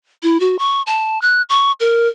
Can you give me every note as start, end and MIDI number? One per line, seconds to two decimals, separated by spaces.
0.23 0.40 64
0.40 0.57 66
0.59 0.82 85
0.87 1.21 81
1.22 1.42 90
1.49 1.72 85
1.80 2.08 70